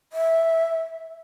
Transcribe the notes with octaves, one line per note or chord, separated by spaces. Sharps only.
E5